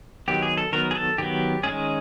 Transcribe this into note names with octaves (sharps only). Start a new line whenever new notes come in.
D#3 F#3 B3 G4
G#4
A4
D#3 F#3 B3 A#4
G#4
A4
D#3 F#3 B3 G4
D#3 G#3 C#4 G#4